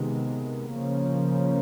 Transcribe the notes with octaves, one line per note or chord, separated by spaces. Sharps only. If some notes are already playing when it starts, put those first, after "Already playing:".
Already playing: C3 D#3 G#3 B3
C#3 F3 A#3 C#4